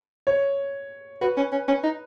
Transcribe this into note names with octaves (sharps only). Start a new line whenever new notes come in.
C#5
F#4 B4
C#4
C#4
C#4
D#4